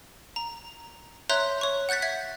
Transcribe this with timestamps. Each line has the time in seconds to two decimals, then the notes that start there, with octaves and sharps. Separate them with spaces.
0.36 A#5
1.30 C#5 E5 A#5 C6 F#6 G6
1.61 C#5 C#6
1.89 F#5 F#6 G6 A6 B6
2.02 E5 G#6 B6